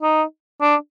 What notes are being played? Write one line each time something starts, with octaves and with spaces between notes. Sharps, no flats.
D#4
D4